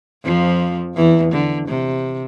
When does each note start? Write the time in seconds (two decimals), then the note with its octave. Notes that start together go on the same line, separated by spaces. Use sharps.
0.24 F2 F3
0.96 E2 E3
1.32 D3
1.68 C3